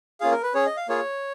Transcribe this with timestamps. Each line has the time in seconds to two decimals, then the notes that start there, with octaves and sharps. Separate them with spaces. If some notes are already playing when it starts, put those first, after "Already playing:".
0.20 A#3 C#4 F4 G#4 F5
0.32 A#4
0.43 B4
0.54 C#4 G#4 C#5
0.66 D#5
0.77 F5
0.88 A#3 F4 G#4 C#5